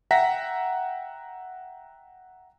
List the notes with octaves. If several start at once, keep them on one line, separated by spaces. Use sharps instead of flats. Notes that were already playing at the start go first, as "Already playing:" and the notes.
E5 F#5 G5 A#5 A#6 B6